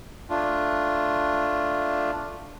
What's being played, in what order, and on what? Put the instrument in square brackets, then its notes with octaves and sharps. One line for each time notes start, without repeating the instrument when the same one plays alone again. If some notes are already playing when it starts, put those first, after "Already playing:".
[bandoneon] A3 D4 F4